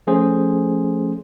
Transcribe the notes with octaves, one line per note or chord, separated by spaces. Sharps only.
F3 A3 C#4 G#4 C5